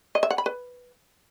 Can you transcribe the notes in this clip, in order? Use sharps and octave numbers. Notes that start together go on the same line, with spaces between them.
D#5
E5
F#5
B5
B4